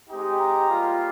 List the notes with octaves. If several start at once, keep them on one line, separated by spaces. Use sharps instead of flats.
G#3 C4 D#4 G4
A#5
G3 A#3 F4